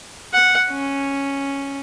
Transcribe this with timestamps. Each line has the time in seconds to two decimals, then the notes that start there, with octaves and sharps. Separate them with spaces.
0.34 F#5
0.70 C#4